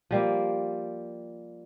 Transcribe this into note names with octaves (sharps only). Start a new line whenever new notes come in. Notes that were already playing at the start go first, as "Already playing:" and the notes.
F3 G3 A#3